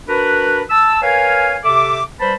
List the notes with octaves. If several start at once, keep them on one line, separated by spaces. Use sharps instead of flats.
D4 F#4 A#4 B4
A5 E6
A#4 B4 C#5 F5 G#5
C3 A4 E5 D6
G3 B4 C5 A5 B5